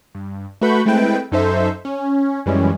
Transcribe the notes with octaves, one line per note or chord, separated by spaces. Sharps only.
G2
A3 F#4 B4 B5 C#6 G6
G#3 A3 C4 E4 B4 G5
F#2 D#4 A4 C5 E5
C#4
F#2 E3 G3 G#3 C#4